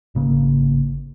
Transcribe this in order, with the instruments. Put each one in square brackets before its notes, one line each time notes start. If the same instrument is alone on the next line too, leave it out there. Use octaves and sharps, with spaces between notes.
[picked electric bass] G#1 C#3 A#3